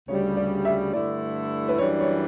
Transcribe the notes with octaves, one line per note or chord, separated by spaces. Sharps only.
D2 C#3 G3 C#5
D5
E5
G2 D3 A3 E4 D5
B4
F#2 E3 G3 D4 C#5
C#5